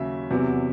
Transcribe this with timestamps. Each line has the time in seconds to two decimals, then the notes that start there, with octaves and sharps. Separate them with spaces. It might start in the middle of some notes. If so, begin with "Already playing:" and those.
Already playing: D#2 C#3 F#3 E5
0.30 E2 C3 F#3